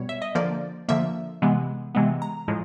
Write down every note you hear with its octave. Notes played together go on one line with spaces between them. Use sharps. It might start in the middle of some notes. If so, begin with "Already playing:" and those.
Already playing: B2 G3 B3 C#5
E5
D#5
D3 F3 A#3 D5
D3 F3 A#3 E5
C3 E3 G#3 B3
C3 E3 G#3 B3
A#5
A2 F3 G#3